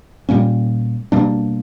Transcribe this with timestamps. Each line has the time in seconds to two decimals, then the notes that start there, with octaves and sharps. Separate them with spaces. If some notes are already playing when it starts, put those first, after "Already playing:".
0.29 A#2 G3 A#3 C#4
1.12 B2 G3 A#3 D4